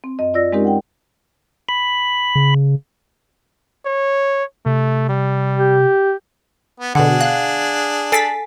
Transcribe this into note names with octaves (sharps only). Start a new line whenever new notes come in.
C4
F#2 D#5
F4 D5 E6 A#6
G#3 C4 C#4 D#4 G4 A#4
F#5 G5
B5
C#3
C#5
C3 A3
G3
G4
B3
B2 D3 D4 G#4 F#5
F5 F#6
A4 G#5 A6 B6 C7 D7